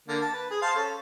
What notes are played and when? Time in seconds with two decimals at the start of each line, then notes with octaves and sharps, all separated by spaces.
0.08 D3 A#3
0.21 A5
0.33 B4
0.50 G#4
0.62 C5 F5 A5
0.75 C#4 A4